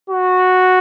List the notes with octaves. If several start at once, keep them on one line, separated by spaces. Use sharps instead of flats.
F#4